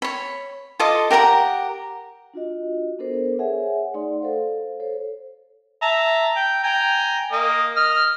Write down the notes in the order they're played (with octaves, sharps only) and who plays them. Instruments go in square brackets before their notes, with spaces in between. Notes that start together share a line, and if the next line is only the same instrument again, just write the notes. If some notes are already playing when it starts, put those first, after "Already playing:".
[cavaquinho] C#5 B5
F4 A4 D#5 D6
G4 A#4 F#5 A#5
[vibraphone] D4 F4 F#4 D#5
B3 D4 A4 A#4 C5
G#4 C#5 E5 F#5 G#5
A3 D#4 D5 F#5 C6
A4 C5 F5
A4 C5 C#5
[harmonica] E5 A5 A#5
G5
G5 G#5 A#5
A#3 D#5
D#5 F6